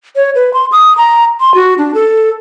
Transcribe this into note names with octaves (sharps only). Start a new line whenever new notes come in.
C#5
B4
C6
D#6
A#5
C6
F#4
D4
A4